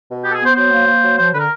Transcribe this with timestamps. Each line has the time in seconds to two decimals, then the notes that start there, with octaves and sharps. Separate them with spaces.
0.10 B2
0.24 B3 G4
0.31 A4
0.35 G#4
0.40 B3
0.46 C5
0.56 F#3 C5
0.71 A#3
0.87 A#3
1.03 F#3
1.18 F3 C5
1.33 D3 B4
1.40 A#4